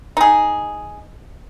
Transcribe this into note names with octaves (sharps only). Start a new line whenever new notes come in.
D#4 G#4